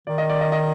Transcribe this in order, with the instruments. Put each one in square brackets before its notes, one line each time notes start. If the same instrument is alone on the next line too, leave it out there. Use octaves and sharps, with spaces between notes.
[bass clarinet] D#3 [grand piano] D5
[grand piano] D#5
D5
D#5
D#5